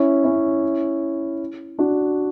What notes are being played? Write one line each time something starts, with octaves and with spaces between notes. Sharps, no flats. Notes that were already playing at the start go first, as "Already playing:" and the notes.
Already playing: C#4 E4
C#4 E4
D4 F#4